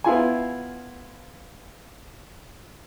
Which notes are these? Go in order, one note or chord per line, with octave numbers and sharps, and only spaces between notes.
B3 E4 F4 G#5